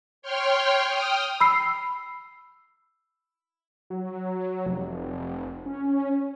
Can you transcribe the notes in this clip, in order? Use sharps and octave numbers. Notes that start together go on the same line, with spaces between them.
C#5 G5 C6 F6
G5 D#6 F6
B5 E6 C7
F#3
F1
C#4